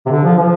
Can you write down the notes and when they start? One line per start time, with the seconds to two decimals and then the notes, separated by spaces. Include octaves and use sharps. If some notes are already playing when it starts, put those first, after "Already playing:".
0.06 C3
0.10 D3
0.25 F3
0.38 F3